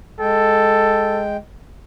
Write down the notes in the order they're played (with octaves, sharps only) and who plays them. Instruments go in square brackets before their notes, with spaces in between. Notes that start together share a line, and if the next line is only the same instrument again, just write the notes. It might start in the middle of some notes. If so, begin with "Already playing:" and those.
[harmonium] G#3 G5 [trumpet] A4